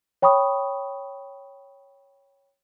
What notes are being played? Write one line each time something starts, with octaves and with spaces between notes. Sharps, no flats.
C#5 G5 B5 C#6 D#6